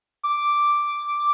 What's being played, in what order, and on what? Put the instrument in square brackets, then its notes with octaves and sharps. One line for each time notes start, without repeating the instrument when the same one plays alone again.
[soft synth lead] D6